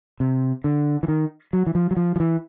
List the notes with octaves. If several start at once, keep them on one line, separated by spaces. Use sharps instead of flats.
C3
D3
E3
D#3
F#3
E3
F3
F#3
F3
F3
E3